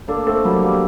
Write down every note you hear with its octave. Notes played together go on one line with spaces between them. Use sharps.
A#3 D4 A4
A3 C4 A4
F#3 G3 A#3
G3 A#3 G4